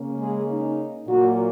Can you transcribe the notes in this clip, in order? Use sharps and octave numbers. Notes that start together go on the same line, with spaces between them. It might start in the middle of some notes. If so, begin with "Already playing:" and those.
Already playing: C#3 A#3 C#4
G#3 G#4
D#4
A#2 F#3 A#3 F#4